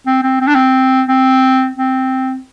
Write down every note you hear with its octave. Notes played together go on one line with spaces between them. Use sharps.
C4
C4
C4
D4
C4
C4
C4